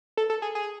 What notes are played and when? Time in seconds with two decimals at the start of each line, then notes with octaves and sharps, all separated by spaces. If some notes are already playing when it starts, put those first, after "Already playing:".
0.17 A4
0.30 A4
0.42 G#4
0.55 G#4